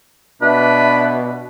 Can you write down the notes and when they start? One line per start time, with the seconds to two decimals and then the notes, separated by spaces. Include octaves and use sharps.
0.42 B2 D4 B4 E5